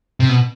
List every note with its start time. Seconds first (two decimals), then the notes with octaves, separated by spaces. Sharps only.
0.20 C3
0.29 B2